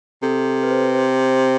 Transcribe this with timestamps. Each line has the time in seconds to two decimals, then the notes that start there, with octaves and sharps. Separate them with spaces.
0.23 C3 A4
0.46 A4
0.63 B4
0.70 C5
0.95 C5
1.20 C5